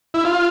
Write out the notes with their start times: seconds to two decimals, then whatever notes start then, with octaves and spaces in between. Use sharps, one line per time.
0.14 E4
0.25 F4